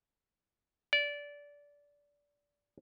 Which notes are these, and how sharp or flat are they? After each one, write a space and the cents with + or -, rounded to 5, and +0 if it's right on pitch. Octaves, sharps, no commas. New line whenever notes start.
D5 -20